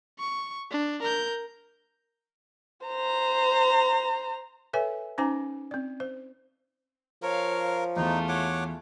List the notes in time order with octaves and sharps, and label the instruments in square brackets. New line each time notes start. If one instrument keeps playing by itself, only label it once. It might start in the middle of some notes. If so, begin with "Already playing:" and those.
[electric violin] C#6
D4
A#4 G6
[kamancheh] C5 A#5
[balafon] A4 B4 C#5 E5 G#5
C#4 D#4 C5 G#5 A#5 D6
C4 D5
C5
[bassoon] F3 [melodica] A#4 [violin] C#5 F5
[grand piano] E2 [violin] A3 F4 [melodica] D#4
[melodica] C#5 F#5 D6